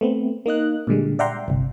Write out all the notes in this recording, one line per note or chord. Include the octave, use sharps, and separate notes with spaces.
A3 B3 C4
A#3 D#4 D#5 F#6
A#2 D3 G3 G#3
D5 E5 F#5 G5 A#5 C6
G1 C2